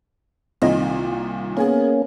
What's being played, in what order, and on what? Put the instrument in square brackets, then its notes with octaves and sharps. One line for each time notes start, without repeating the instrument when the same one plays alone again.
[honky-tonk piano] C2 A#2 D#3 [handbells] C4 D#5
[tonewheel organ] A#3 C#4 [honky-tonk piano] B3 G#4 A#4